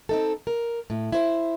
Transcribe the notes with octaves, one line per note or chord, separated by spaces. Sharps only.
C4 D#4 A4
A#4
A2
E4 C5